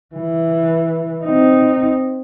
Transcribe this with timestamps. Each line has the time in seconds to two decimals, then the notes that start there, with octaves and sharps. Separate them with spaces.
0.15 E3
1.24 C4 D#4